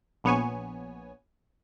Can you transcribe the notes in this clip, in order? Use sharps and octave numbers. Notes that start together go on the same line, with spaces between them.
A#1 B3 C#5 G#5